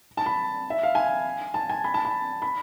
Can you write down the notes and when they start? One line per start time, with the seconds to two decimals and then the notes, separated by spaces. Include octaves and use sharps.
0.17 A5
0.26 B5
0.70 E5
0.83 F5
0.95 G#5
1.54 A5
1.70 G#5
1.84 B5
1.94 A5
2.05 B5
2.42 B5